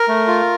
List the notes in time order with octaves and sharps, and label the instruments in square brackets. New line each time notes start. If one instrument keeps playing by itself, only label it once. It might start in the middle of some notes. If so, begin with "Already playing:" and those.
Already playing: [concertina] A#4
A3
F4